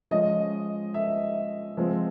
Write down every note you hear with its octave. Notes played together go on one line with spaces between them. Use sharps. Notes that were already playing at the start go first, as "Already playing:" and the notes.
F3 G#3 C#4 D#5
E5
F3 G#3 C4